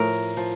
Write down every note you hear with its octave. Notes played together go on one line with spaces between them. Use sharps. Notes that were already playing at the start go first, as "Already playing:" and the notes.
Already playing: A2 F3 A#4
F3